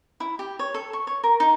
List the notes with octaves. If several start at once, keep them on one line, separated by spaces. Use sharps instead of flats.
E4
G4
C#5
A4
C#6
C#5
A#4
D#4